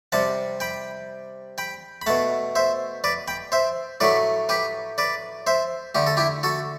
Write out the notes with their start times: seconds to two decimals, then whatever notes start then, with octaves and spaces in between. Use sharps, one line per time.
0.12 C3 G3 F#5 A5
0.60 G5 B5
1.58 G5 B5
2.02 B5
2.06 B2 A3 F#5 A5
2.55 C5 E5
3.04 B4 D5
3.28 G5 B5
3.52 C5 E5
4.00 A2 F#3 A3 B4 D5
4.49 G4 B4
4.98 B4 D5
5.47 C5 E5
5.95 D3 A3 G4
6.07 A4
6.17 E4 G4
6.43 F#4 A4